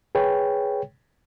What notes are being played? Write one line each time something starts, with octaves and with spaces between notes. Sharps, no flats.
G#4 B4 C#5 G5